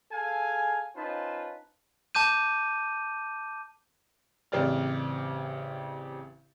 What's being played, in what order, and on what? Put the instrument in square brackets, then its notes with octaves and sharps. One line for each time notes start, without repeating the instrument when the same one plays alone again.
[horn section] G#4 A4 F5 G#5
C#4 D#4 F4 B4 C5 A5
[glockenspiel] A5 D6 G6 D#7
[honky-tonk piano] A1 C#3 C4 G4 D5 F6